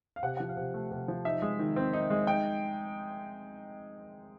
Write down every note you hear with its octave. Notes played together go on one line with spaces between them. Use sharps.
F5
C3 F#5
F3 F#5
F5
C3
A3
C3
F3
D#4 E5
G#3
D#3
C4
D#4
G#3
D#4 G5